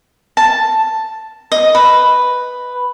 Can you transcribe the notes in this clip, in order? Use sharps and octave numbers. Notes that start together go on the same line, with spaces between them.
A5
D#5
B4